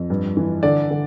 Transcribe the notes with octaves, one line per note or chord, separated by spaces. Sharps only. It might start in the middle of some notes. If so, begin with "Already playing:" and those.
Already playing: F2
G2
E3
D3 D5
D3